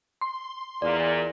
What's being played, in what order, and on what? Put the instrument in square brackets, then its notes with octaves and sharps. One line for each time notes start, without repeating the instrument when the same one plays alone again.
[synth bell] C6
[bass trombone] E2 [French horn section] A#2 [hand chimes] D5